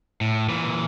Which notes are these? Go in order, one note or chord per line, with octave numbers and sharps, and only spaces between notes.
A2
A#2 E3